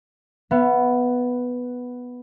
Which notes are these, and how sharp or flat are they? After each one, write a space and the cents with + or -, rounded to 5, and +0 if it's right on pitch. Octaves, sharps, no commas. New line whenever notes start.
B3 +0 E5 +40